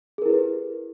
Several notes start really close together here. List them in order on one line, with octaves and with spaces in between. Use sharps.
G#4 A#4 E4 B4 G4